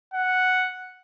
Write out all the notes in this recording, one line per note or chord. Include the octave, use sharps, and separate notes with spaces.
F#5